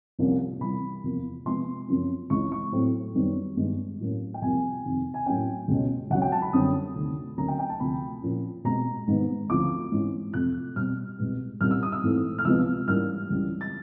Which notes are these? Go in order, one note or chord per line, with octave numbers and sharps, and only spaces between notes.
C2 C3 F3 A#3 C#4
C3 E3 G3 C4 B5
E2 C3 F3 A#3
C3 F3 G#3 B3 C6
F#2 C#3 F3 A#3 C#4
C#2 C#3 E3 G#3 C#6
C#6
A2 F#3 A3 C4
F#2 D#3 G3 B3
G2 D#3 G#3 B3
A2 F#3 A#3 C#4
G5
C2 C3 F3 A#3 G#5
F2 C3 D#3
G#5
A2 F#3 A#3 C#4 G5
C#2 B2 G#3 C#4
C#2 C#3 F#3 F#5
G5
A5
B5
F#2 D3 G3 C4 D#6
D2 C3 D#3
D2 C#3 F#3 A#3 C#4 A#5
G5
G5
A5
D2 C3 F3 B5
A#2 F3 A#3 C#4
B2 G#3 C4 A#5
G#2 D#3 G#3 B3
D2 C#3 F3 D6
G#2 E3 G#3 C#4
F2 C3 F3 A3 F#6
B2 G3 C4 F6
C2 B2 G#3 B3
C2 A#2 G3 A#3 C#4 F6
E6
D#6
E6
G#2 E3 A3 C4
F6
C#2 C3 F3 G#3 B3 E6
G#2 E3 G3 A#3 C#4 F6
C#2 C#3 E3 G3
A6